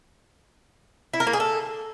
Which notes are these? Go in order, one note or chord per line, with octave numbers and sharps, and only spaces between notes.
E4
A#4
A#3
G#4
A4